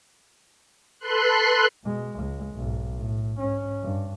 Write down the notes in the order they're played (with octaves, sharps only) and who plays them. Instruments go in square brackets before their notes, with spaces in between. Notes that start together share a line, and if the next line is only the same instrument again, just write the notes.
[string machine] A4 B4 C6 F#6
[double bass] B2 G#3
C#2 G#3
B1 G#2
A2
G#2 C#4
G2